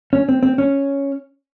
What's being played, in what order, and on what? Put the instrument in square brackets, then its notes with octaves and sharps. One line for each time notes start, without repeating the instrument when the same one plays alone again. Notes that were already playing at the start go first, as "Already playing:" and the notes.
[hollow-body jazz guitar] C#4
C4
C4
C#4